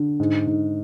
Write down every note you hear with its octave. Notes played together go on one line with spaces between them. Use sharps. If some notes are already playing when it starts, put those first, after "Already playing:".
Already playing: D3
G#2
G#2